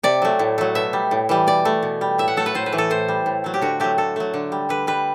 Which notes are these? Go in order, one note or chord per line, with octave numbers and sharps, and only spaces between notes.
C3 D5
F#3 A3
A2
F#3 A3
B2 E5
G3
A2
E3 G3
B2 D5
A3
B2
G3
A2 E5
F#5
F#3 A3 A4
B4
A2 C5
B4
E3 A3
A4
A2 C5
G3
A2
F#3 A3
G4
D3 F#4
F#3 A3 G4
D3 A4
F#3 A3
D3
G3
D3 B4
G3 B4